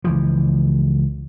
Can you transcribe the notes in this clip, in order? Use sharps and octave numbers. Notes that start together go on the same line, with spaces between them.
C#2 E3 F3